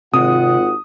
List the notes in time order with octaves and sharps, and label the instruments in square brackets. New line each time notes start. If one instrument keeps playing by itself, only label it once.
[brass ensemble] G#1 F4 F#5 [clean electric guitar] C3 [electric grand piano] D#6